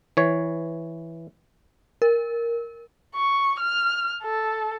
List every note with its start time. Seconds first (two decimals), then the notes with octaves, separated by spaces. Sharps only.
0.17 E3 C#5
2.02 A#4
3.15 C#6
3.59 F6
4.23 A4